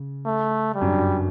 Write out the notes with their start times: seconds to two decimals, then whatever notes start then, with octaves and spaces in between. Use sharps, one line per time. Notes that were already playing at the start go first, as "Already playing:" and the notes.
Already playing: C#3
0.26 A3
0.75 G3
0.81 F#2
0.87 G2
0.99 F#2